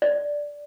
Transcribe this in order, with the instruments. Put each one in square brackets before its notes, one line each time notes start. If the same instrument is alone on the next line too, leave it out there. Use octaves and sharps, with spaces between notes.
[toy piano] D5